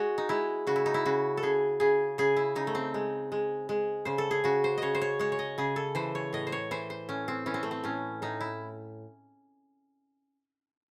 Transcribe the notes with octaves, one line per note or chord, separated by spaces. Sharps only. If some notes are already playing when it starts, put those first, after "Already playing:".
Already playing: G#3 F#4
D#4
G#3 E4
C#3 F#4
E4
D#4
E4
C#3 F#4
A4
C#3 G#4
C#3 G#4
C#3 G#4
E4
C#3 D#4
A3
C4
G#3
G#3
G#3
C#3 C5
A4
G#4
C#3 F#4
C5
C#3 C#5 D#5
C5
C#5
G#3 C#5
C#5
D#5
C#3 G#4
A4
E3 C5
C#5
A2 D#5
C5
C#5
E3 C5
C5
A2 C#4
C4
E3 C#4
C4
A3
C4
A2 C#4
A2 D#4
E4